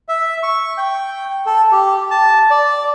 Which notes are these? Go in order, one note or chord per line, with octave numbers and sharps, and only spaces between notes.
E5
C#6
G5
A4
G4
A5
D5